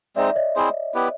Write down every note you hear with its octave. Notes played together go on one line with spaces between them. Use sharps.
G#3 C4 D#4 D5 E5
C#5 D#5
C4 E4 G#4 C5
B3 E4 G4 B4